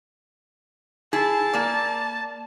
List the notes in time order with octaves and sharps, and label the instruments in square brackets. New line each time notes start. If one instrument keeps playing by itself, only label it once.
[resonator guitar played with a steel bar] E4 G#4 [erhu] A5
[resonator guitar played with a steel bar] A#3 D5